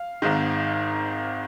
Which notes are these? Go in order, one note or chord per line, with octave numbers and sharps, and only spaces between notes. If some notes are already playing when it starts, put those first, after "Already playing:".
Already playing: F5
G#1 G#2 D#3